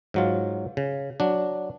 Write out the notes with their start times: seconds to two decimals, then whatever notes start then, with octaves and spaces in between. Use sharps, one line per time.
0.14 G#2 F#3 F4
0.77 C#3
1.20 F#3 D4